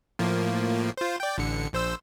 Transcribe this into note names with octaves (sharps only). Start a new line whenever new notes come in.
A2 F3 A#3
F4 C5
D5 G5
A1 D3 C#7
A#1 C5 E6